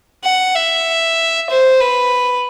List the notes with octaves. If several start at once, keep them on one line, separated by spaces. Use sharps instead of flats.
F#5
E5
C5
B4